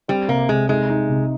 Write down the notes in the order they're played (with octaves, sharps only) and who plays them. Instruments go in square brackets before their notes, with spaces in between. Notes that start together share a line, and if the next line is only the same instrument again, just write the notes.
[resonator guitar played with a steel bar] G3 [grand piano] C4
[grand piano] C3 [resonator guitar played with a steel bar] A#3
[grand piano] C3 [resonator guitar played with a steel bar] G#3
[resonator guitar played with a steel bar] G#3 [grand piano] D#4
[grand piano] D#4
C3